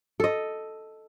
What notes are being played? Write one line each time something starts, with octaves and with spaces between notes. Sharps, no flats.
A4 D#5